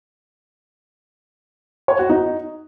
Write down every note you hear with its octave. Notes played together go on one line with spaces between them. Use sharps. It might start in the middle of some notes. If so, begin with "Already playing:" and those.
C#5
F#4
D#4